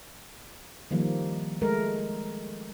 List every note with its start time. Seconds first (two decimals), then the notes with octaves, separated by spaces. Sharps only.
0.91 D#3 F3 G3 A#3
1.61 G#3 A3 A#4